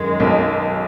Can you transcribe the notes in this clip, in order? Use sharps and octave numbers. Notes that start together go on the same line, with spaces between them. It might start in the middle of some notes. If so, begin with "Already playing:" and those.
Already playing: F#2 D#3 G#3
B1 B2